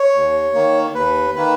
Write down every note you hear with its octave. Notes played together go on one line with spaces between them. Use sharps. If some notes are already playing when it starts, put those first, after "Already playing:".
Already playing: C#5
D#2
D#3 A#3
D#2 B4
D#3 A#3 B4